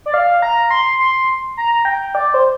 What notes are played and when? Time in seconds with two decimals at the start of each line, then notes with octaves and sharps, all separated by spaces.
0.06 D5
0.14 F5
0.42 A#5
0.71 C6
0.99 C6
1.57 A#5
1.85 G5
2.15 D5
2.34 C5